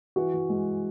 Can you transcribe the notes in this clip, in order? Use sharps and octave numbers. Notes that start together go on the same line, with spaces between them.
E3 F#4
E3
G#3